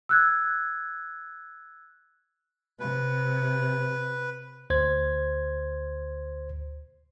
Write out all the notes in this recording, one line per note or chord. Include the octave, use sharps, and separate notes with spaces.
E6 F#6 G#6
C3 B4
D2 C5 G#6